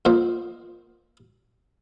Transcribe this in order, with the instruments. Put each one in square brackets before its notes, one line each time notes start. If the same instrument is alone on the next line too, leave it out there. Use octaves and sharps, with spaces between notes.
[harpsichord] F2 A#2 C5